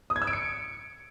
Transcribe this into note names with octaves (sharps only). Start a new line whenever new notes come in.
D#6
G#6
E6
D7
C#7